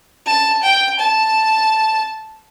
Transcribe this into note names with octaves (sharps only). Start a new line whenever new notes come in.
A5
G5
A5